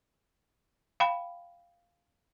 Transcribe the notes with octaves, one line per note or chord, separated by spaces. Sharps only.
F5 G5 B5